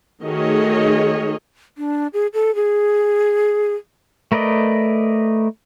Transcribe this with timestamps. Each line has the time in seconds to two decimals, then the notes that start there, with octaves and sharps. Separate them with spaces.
0.23 D#3 A3 F#4 G#4 C#5 D#5
1.78 D4
2.14 G#4
2.34 A4
2.55 G#4
4.32 A3 A#4 B4 D5 D#5